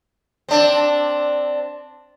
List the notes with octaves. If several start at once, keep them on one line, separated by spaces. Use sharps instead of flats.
C4 D4